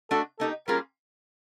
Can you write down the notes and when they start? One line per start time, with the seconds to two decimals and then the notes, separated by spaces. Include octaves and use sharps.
0.11 A3 D4 F#4 A4
0.40 A#3 D#4 G4 A4
0.68 G3 A#3 C#4 F4 G#4 A#4